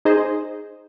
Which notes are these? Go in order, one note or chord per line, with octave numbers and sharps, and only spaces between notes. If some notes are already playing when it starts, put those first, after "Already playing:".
D#4 G#4 C5 D#5